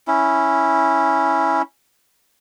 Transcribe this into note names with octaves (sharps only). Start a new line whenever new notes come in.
C#4 E4